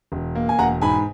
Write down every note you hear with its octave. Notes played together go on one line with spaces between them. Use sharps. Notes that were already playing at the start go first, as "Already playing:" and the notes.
E1
A#3
G#5
E1 F#5 A#5
G#2 G#5 B5